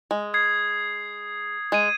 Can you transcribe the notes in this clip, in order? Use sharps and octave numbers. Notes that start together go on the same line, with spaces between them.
G#3
D#6 G#6 C7
G#3 G#6 D#7